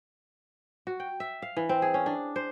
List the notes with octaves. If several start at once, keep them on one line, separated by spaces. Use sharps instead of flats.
F#4
G5
E5
F5
E3
C4
G#4
C#4
D4
C5